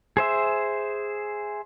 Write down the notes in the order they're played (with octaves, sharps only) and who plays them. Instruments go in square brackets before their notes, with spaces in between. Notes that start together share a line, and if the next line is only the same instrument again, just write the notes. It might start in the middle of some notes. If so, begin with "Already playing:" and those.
[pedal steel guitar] G#4 C5 E5